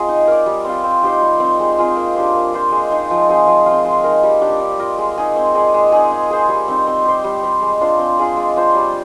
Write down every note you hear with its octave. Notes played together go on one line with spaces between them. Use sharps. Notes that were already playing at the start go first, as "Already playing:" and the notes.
Already playing: C4 F4 G#4 D#5
D#4
A#4 D5
G3
C4 F4
C4
D#4 G4 C5
G3
C4 D#4
G#3
C4 F4 G#4
A#3
D4 G4 C5
A#3
F4 C5
G#3
D#4 G#4
F3
C4 D#4 G#4
F3
C4 F4
G#3
D#4 A#4
G3
A#3 D4 G4
D4
F4 A#4 D#5
G#3
D#4 G#4
C4
D#4 G#4 D5
G#3
C4 D#4 G#4
D#4
G#4 C5
G3
C4 D#4
C4
G4 C5
G3
C4 G4
G#3
D4 F4 C5
C4
F4 G#4 D5
G#3
D4 F4 C5
G3